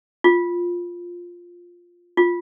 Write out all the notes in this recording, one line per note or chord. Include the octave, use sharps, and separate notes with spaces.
F4
F4